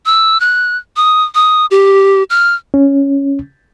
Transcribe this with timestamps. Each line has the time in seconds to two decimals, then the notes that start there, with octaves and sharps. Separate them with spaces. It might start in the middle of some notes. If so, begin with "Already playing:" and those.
0.06 E6
0.40 F#6
0.96 D#6
1.35 D#6
1.71 G4
2.30 F6
2.74 C#4